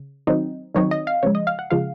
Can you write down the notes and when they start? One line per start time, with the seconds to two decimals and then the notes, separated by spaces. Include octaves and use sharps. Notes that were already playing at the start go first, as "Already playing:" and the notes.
Already playing: C#3
0.27 D#3 F#3 C4 D#4
0.75 D#3 F#3 C4 D#4 C#5
0.91 D#5
1.07 F5
1.23 C#3 F3 G#3 C#5
1.35 D#5
1.47 F5
1.59 F#5
1.71 C#3 F3 G#3 F5